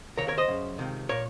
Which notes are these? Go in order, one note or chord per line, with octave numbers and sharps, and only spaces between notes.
D#2 C#3 A#4 C#5
A#4 C#5
C5 D#5
F#2 C#3
C#2 C3 D#3
A#2 A#4 C#5